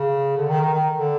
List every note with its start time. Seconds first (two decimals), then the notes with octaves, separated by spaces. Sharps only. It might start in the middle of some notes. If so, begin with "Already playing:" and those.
Already playing: C#3
0.37 D3
0.49 D#3
0.61 D#3
0.73 D#3
0.98 D3